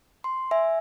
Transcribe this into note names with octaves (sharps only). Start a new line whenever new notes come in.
C6
E5 G#5